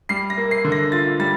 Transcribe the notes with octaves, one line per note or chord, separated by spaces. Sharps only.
G3 C7
A#6
A#3
C7
D3
A#6
F4 A6
G3 A6